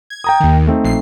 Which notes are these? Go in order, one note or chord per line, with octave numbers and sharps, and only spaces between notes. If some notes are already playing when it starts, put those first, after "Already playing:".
G#6
G5 A#5 D#6
D#2 D#3
A3 C4 D#4
A#1 C7